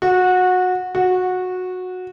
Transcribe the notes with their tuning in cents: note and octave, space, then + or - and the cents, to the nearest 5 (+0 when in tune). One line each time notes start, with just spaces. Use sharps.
F#4 -20
F#4 -15